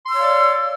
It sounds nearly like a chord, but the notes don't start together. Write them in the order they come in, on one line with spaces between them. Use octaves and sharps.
C6 E6 C#5 F5 D5